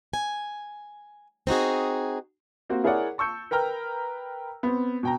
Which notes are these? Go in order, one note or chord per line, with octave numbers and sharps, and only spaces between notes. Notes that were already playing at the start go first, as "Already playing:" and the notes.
G#5
C4 D#4 F#4 G#4
A#3 C4 F#4
E4 G#4 A#4 C#5 D5 F#5
A5 C#6 E6 G6 C#7
A#4 B4 G5 A#5 F6
B3 C4
B2 G5 A#5